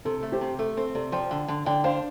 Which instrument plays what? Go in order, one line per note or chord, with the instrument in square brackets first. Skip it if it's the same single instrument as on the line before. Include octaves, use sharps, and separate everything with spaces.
[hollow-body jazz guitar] C3 [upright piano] A4
[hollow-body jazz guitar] A3
[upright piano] G4 C5
[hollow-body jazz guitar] C3
[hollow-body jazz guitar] A3 [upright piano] A4
[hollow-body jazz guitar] C4 [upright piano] A4
[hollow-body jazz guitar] C3 [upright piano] A4 D5
[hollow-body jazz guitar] F3 [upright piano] D5 G5
[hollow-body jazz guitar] D3
D3
[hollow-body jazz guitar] D3 [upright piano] D5 G5
[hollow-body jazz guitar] D4 [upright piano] C5 F5